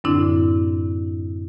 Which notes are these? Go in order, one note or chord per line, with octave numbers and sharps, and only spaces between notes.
F#2 A2 D3 C4 D4 E4